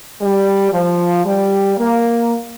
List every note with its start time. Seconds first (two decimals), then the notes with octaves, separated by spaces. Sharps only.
0.22 G3
0.73 F3
1.26 G3
1.78 A#3